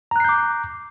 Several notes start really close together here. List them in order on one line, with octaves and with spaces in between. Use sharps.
A#5 F#6 C7 G6 D6